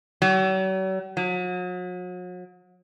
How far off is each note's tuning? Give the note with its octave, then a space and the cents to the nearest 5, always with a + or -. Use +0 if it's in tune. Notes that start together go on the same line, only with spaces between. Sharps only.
F#3 +45
F#3 -40